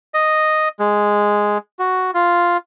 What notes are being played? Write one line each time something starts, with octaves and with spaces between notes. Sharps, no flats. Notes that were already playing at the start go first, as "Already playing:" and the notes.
D#5
G#3
F#4
F4